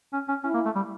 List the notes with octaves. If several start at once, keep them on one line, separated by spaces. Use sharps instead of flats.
C#4
C#4
C#4 E4
A#3
A3
G3